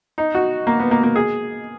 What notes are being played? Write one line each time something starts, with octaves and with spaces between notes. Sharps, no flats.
D#4
F#4
A#3
B3
A#3
A#3
G#4